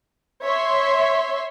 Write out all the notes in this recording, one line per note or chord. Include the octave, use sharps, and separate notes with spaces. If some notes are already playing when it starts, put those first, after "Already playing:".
C#5 E5 C6